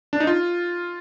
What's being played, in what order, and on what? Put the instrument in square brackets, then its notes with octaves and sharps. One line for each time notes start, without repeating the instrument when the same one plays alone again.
[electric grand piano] D4
D#4
F4